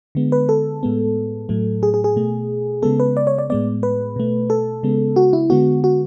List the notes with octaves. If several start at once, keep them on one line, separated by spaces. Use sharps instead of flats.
D3 G#3 B3
B4
A4
A2 G#3 B3
A2 F#3 A3
G#4
G#4
G#4
B2 A3
C#3 G#3 B3 A4
B4
D5
C#5
D5
A2 G#3 B3 D5
B4
B2 A3
A4
C#3 G#3 B3
F#4
E4
D3 G#3 B3 F#4
F#4